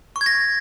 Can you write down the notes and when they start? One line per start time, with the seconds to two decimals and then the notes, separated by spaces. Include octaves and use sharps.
0.16 C#6
0.21 G#6
0.26 A#6